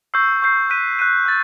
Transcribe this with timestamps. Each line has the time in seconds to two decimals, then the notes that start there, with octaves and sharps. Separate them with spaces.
0.14 C#6 E6 G6 C7
0.42 C#6 E6 G6 C7
0.70 F#6 B6 D#7
0.99 F#6 B6 D#7
1.26 E6 A6